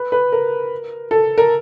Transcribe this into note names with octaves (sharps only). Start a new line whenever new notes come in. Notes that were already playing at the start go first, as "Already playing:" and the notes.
Already playing: B4
B4
A#4
A4
A#4